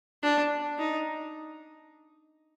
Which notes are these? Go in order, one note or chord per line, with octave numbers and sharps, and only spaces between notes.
D4
D#4